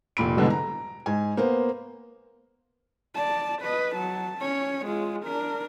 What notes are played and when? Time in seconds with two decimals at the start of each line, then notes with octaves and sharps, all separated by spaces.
0.17 F1 A#2 B5 D7
0.36 G#2 B2 D3 E3 F#3 G3
0.50 A#5
1.06 G#2 G#5
1.37 A#3 B3 C5
3.15 D5 A5
3.62 B4 D#5
3.95 F#3 A5
4.39 C#4 C#5
4.86 G#3 F4
5.23 D4 A#4